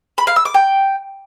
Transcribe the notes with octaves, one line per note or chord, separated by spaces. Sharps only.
B5
F5
E6
D6
G5